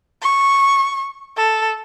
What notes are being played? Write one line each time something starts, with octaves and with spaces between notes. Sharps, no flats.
C#6
A4